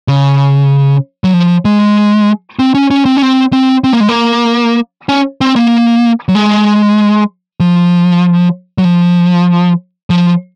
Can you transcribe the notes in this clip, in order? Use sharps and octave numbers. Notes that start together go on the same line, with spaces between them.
C#3
F#3
F3
G#3
C4
C#4
C#4
C4
C#4
C4
C4
C4
A#3
G#3
A#3
C#4
C4
A#3
F#3
G#3
F3
F#3
F3
F3